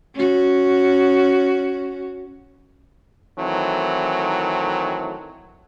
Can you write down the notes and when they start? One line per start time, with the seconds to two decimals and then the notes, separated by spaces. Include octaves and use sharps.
0.14 C#4 F#4
3.38 D#3 E3 F#3 A3 C4